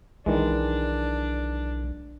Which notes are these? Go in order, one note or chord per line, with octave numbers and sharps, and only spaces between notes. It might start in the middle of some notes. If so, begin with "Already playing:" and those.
B1 D#3 E3 G#3 D4